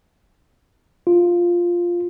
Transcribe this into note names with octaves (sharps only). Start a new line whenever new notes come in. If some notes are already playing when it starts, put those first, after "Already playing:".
F4